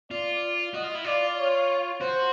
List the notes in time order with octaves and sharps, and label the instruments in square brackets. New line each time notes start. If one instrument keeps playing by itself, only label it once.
[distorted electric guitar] F4 [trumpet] D5
[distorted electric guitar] F#4 [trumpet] D#5
[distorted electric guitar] F4
E4
[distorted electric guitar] F4 [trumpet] D5
[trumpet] C#5
[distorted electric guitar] F#4 [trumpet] C5